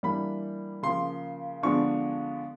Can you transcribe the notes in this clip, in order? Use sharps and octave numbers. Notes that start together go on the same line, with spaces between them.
E3 G3 A#3 D4 B5
C#3 F3 A#3 C6
D3 F3 G#3 B3 D4 C#6